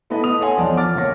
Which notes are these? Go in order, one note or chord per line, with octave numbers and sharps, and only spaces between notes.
A3 B3 E4 B4 D#5 A5
D#6 F7
A4 C#5 D#5 F#5 G#5 C6
E2 F3 D5 A5
D6 F6 A6
C#2 A#3 C#5 A#6